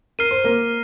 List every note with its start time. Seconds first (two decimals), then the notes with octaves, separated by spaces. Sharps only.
0.19 A#4 F6 C7 D#7
0.31 C5
0.44 A#3 A#4